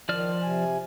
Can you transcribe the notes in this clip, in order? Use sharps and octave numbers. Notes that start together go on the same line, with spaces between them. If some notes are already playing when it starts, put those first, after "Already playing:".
D#3 F3 D5 F6
C3 G#5